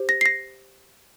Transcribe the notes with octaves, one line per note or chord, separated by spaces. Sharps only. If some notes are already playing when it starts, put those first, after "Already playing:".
Already playing: G4 C5
A#6
C7
A#6